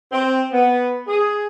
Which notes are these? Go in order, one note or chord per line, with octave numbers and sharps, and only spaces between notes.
C4
B3
G#4